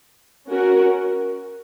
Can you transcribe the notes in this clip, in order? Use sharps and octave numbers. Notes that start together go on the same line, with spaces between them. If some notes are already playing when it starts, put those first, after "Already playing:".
C#4 F#4 A#4